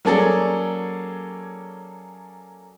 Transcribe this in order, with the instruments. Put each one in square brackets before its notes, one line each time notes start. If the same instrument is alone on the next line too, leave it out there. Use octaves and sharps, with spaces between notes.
[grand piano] F#3 A#3 C#4 G#4 A4 D5